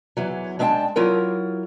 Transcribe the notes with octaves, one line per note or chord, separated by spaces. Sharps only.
E2 E3 F#3
G#3 D4 E5 F5 G5 A5
F#3 E4 F4 A#4